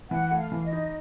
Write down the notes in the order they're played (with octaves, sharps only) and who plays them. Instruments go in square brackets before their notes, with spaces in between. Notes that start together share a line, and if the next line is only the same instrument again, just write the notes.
[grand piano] E3 [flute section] F#5
[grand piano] A3
[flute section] F5
[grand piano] E3
[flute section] D#5
[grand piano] D#4